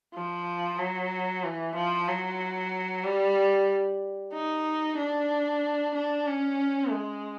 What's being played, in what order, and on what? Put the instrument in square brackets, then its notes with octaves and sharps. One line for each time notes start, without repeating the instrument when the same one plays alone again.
[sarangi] F3
F#3
E3
F3
F#3
G3
D#4
D4
D4
C#4
G#3